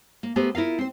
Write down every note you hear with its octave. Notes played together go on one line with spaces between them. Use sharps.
A#3
A3 B3 G4 A#4 C5
E4 F4 A#4 F5
C4 C5